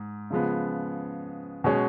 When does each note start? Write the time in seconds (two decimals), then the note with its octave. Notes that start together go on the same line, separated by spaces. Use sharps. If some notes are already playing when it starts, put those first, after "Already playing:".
Already playing: G#2
0.31 C#3 F3 G#3 B3
1.64 B2 G#3 C#4